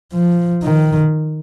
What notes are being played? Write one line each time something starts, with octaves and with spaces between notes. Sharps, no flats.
F3
D#3